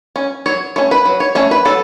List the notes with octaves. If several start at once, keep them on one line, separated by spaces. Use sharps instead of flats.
C#4
F#3 C#5
A3 C#4 C#5
B4
F#3
C#5
A3 C#4 C#5
B4
F#3 A4